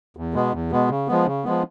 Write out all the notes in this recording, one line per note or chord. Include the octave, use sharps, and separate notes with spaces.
E2
B2 G#3 B3
E2
B2 G#3 B3
C#3
F3 G#3 B3
C#3
F3 G#3 B3